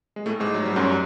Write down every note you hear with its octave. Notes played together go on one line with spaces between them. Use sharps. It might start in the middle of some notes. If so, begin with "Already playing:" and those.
G#3
A2 A3
G#2 G#3
F#3
G3
F#2 F#3